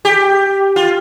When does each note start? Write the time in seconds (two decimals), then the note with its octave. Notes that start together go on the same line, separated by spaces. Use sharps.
0.05 G4
0.76 F4